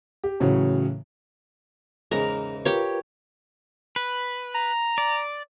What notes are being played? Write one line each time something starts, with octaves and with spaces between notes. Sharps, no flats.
G4
A2 C#3 E3 F#3
E2 G#2 C#3 G#4 A#4 D#5
F4 G4 A#4 B4 C#5
B4
A#5
D5